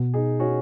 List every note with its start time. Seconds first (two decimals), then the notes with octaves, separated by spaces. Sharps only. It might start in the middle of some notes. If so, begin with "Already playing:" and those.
Already playing: B2 B3
0.14 D#4 G#4
0.40 C#4 F#4